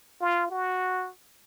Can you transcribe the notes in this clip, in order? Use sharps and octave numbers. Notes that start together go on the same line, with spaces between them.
F4
F#4